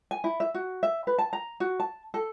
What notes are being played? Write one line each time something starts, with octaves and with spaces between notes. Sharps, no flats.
G#5
E4
E5
F#4
E5
B4
A5
A#5
F#4
A5
A4